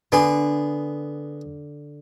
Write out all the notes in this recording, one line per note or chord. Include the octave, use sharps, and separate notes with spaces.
D3 B3 G#4